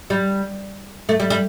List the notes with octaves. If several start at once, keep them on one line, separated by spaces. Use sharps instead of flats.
G3
A3
G3
G3